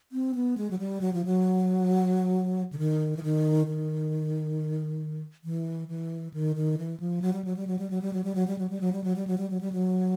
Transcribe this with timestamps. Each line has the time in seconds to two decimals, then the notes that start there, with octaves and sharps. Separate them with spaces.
0.12 C4
0.35 B3
0.57 G#3
0.71 F#3
0.79 G3
1.01 F#3
1.14 F3
1.25 F#3
2.73 D3
2.78 D#3
3.17 E3
3.23 D#3
3.67 D#3
5.44 E3
5.89 E3
6.34 D#3
6.56 D#3
6.78 E3
7.00 F3
7.22 F#3
7.33 G3
7.45 F#3
7.57 G3
7.67 F#3
7.79 G3
7.90 F#3
8.02 G3
8.13 F#3
8.24 G3
8.35 F#3
8.47 G3
8.58 F#3
8.70 G3
8.81 F#3
8.92 G3
9.04 F#3
9.16 G3
9.27 F#3
9.38 G3
9.50 F#3
9.61 G3
9.73 F#3